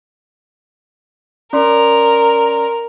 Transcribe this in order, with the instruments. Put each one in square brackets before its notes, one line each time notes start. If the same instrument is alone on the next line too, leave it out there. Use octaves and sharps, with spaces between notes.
[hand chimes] C#4 D5 C6 [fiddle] A#4